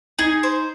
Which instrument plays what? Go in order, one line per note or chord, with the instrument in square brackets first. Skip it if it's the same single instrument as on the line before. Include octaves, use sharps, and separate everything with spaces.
[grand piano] D#4 [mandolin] G#4
[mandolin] C5